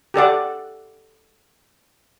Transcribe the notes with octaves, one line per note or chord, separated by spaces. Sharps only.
G4 A4 D5 F#5